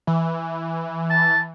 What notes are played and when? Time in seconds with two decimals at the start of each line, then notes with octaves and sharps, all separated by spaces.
0.07 E3
1.10 A5